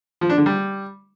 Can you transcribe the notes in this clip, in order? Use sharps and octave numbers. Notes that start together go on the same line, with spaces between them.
F3
D4
D3
G3